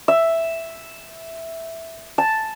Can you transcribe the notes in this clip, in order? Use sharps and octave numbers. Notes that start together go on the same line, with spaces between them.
E5
A5